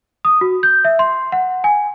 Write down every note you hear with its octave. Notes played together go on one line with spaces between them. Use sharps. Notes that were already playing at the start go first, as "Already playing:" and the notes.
D#6
F#4
G6
E5
C6
F#5
G#5